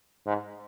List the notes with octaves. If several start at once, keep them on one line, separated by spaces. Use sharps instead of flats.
G#2